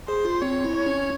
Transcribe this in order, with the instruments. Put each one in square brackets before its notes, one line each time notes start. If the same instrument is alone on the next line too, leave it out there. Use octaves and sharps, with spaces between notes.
[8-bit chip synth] G#4 [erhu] C5
[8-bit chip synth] F4
[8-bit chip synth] C4 [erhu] C#5
[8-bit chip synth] E4
[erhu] C#5
[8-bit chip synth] C#4